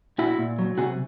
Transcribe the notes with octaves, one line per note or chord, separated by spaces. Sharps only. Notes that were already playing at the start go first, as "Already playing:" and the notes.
A#2 E4 F#4
A#2
F#3
C3 F#4 G#4